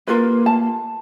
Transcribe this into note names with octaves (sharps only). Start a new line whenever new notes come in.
A#3 F4 A#4 B4
A5